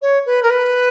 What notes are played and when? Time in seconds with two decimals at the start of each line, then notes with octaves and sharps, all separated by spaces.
0.01 C#5
0.26 B4
0.42 A#4
0.50 B4